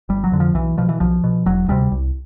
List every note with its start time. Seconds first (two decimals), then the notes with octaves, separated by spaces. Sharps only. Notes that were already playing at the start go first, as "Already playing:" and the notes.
0.09 G1 G3
0.24 F#3
0.32 F2 D3
0.40 F3
0.54 B1 E3
0.78 B2 F3
0.89 E3
1.00 B1 F3
1.24 B2
1.46 E1 F#3
1.68 D2 C3 G3
1.92 C2